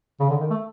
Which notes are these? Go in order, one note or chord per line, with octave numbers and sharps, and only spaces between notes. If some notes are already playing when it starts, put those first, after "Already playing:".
C#3
D3
D#3
A3